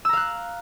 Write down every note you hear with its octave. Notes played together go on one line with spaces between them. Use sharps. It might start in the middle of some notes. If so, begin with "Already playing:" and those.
F5 A#5 E6 F#6